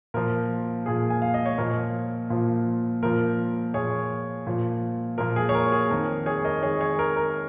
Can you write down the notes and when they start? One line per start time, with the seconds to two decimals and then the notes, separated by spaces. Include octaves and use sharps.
0.14 A#2 F3 A#4
0.86 A#2 F3 G#4
1.10 G#5
1.22 F5
1.34 D#5
1.46 C#5
1.58 A#2 F3 A#4
2.30 A#2 F3
3.03 A#2 F3 A#4
3.74 A#2 F3 G#4 C#5
4.47 A#2 F3
5.18 A#2 F3 A#4
5.36 G#4
5.49 C#5
5.55 A#4
5.72 G#4
5.90 F2 D#3 A#4
6.26 G#4 C#5
6.45 A#4 D#5
6.63 F2 D#3 G#4 C#5
6.81 G#4 C#5
6.99 A#4
7.17 A#4